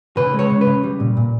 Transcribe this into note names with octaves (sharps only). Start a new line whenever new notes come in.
C#3 B4
G#3
C#5
C#3
B4
C#3
G3
A#2
A#2